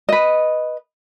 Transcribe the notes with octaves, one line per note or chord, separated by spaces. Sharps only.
B4 D#5